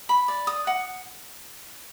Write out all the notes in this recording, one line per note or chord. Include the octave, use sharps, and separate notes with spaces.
B5
D5
D#6
F#5